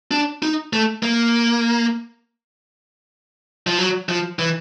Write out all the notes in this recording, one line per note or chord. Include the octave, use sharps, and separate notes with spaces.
D4
D#4
A3
A#3
F3
F#3
F3
E3